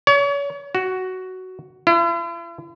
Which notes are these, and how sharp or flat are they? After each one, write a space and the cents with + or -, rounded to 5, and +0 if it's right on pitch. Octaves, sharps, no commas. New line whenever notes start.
C#5 +35
F#4 +10
E4 +45